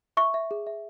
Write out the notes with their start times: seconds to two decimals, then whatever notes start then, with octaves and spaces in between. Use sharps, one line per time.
0.17 E5 C#6
0.34 E5
0.51 G#4
0.67 E5